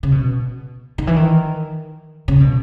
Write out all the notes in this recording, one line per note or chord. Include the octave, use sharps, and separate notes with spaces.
C#3
B2
D#3
E3
D#3
C#3
B2